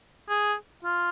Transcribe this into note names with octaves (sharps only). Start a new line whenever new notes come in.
G#4
F4